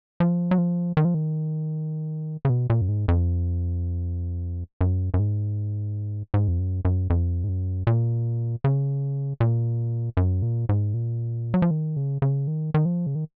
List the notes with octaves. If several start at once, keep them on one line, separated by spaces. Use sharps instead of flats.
F3
F#3
F3
D#3
F3
D#3
C#3
B2
A#2
F#2
G#2
F2
F#2
F#2
G#2
G#2
F2
F#2
F#2
F2
G#2
F#2
A#2
C#3
A#2
F#2
A#2
G#2
A#2
F#3
F3
D#3
C#3
C#3
D#3
D#3
F3
C#3
D#3